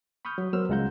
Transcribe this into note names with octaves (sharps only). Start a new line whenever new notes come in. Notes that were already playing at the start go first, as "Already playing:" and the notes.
B5 C#6 D#6 F6 G6
F#3
F#3 B3 A#4 C5 E6 F6
C#2 G#3 F4 F#5 A#5 G6